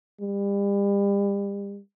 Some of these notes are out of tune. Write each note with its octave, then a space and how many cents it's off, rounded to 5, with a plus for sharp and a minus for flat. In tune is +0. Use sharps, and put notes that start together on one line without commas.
G3 +35